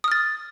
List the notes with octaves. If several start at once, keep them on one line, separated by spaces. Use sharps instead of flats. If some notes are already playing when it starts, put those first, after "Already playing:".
D#6 F6 A6